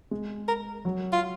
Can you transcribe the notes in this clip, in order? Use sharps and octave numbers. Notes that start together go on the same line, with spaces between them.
G#3
A#4
F#3
F4